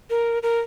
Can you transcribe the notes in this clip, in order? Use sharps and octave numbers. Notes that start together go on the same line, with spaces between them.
A#4
A#4